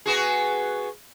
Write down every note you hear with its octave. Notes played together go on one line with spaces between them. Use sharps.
B3 F#4 G#4